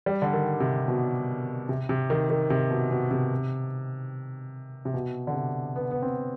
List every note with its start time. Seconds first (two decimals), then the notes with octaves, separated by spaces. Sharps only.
0.06 G3
0.22 D3
0.33 D#3
0.60 C3
0.88 B2
1.69 C3
1.89 C3
2.10 D#3
2.30 D#3
2.50 C3
2.70 B2
2.91 B2
3.11 C3
4.85 C3
4.94 B2
5.27 D3
5.34 C3
5.76 B3
5.91 B3
6.02 C4